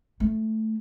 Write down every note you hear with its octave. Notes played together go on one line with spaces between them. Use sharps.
A3